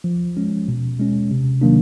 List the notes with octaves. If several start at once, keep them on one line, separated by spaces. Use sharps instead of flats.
F3
G#3 C#4
B2
G#3 C#4
C3
D#3 F#3 A#3 D4